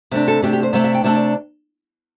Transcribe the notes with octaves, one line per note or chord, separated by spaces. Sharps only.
C3 A3 D4
A4
C3 A3 D4 G4
G4
C5
C3 A3 D4 E5
E5
G5
C3 A3 D4 E5
D5